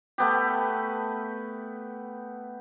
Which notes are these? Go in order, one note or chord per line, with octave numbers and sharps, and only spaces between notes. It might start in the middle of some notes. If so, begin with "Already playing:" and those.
A3 B3 G4